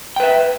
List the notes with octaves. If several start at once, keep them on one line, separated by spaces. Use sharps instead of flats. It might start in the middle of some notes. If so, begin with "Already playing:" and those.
B4 E5 G5